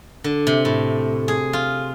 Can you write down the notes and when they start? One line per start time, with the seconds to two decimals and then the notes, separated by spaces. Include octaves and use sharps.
0.24 D3
0.47 C3
0.65 A2
1.28 G#4
1.53 F4